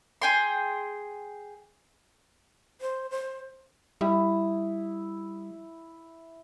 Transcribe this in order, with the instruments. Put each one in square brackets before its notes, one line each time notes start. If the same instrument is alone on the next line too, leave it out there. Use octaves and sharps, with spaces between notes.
[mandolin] G#4 G5 C6
[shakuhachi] C5
C5
[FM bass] G3 [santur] E4 D#6